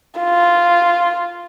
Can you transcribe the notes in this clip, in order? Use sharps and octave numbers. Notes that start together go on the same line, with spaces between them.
F4